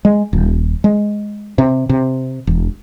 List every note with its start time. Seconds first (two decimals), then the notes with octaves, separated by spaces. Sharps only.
0.05 G#3
0.33 D#1
0.84 G#3
1.58 C3
1.89 C3
2.47 E1